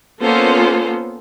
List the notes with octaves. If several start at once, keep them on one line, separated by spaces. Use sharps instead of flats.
A#3 B3 C#4 F4 A4 C5